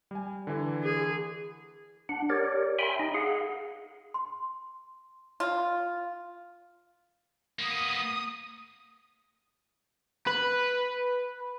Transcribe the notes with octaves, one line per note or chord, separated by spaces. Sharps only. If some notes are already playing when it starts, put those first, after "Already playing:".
G3 G#5
D3 E3
G#4
D4 F#5
G4 A#4 C#5 D5
E5 G5 G#5 B5 C6
D#4 D#5
G#4 F5 F#5
C6
F4
A#3 B3 D#6
B4